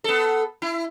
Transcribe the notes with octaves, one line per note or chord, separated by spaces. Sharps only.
B3 A4
E4